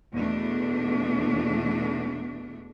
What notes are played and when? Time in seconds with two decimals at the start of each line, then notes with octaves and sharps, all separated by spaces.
0.13 E2 B2 A3 D4